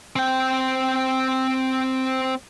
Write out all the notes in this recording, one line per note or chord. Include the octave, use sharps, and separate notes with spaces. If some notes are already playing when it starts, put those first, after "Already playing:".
C4 G5